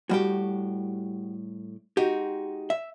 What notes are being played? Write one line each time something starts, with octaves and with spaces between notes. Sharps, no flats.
A2 G3 F#4 G4 G5
G#3 D#4 F#4 G4
E5